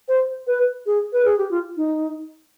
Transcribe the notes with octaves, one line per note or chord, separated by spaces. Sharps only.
C5
B4
G#4
B4
G#4
G4
F4
D#4